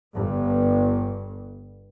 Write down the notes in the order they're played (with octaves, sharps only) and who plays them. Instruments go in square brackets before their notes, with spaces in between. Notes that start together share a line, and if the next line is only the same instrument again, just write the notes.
[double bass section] G1 G2